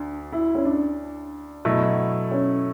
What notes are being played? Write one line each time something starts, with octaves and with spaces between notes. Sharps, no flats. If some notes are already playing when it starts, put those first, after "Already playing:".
Already playing: D2 D4
E4
C#4
D4
B2 F#3 A3 E4
C#4